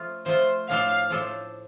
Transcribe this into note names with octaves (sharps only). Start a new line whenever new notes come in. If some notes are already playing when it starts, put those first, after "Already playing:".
Already playing: F3 A3 F4
F3 A3 F4 C5
A2 F3 D4 A4 C5 F5
A2 F3 D4 A4 C5